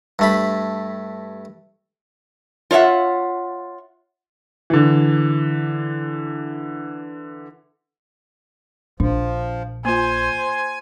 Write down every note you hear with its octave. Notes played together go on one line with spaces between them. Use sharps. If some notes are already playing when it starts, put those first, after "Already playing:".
G2 A3 B5
F4 C#5 D5 E5 F#5
D3 E3
A#1 F3 D4
A#3 F4 C5 G#5